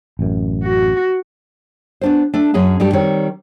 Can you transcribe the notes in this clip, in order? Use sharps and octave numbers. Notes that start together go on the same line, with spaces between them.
A1 F#2
F#4
B3 D4 C5
A3 D4
F#2 C#4 G#4 A5
G2 G3 A3 G4
D#3 G3 C4 C#5